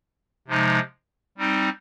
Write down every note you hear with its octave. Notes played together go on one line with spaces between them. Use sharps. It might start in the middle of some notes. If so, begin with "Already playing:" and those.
C3 F3 G#3 D#4
G3 C4 D#4